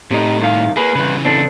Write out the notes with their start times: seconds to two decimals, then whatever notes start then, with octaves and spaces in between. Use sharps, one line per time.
0.11 A2 C3 D#4
0.39 C2 D#3 F5
0.77 A#3 G#4 B4
0.95 C2 C#3 E3 B4
1.25 C4 D4 A4